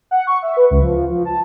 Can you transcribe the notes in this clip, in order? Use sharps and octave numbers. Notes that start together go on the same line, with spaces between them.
F#5
C#6
E5
B4
C#2
F3
F3
F3
A5